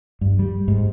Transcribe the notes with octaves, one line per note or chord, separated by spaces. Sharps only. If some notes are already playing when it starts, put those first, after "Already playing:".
G2
G3
G#2